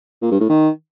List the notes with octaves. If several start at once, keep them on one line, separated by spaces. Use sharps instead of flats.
A#2
G2
A2
D#3